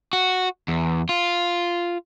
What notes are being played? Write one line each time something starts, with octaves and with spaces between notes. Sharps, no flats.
F#4
E2
F4